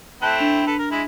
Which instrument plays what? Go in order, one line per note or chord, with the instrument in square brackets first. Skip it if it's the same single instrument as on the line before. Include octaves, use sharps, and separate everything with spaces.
[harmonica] A3 C4 E4 [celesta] A5 F#6
[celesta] D4 F7
[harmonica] A4 B4
A#4
G#3 E4 B5